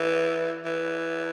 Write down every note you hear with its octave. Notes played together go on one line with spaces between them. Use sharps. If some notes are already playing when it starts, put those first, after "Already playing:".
Already playing: E3
E3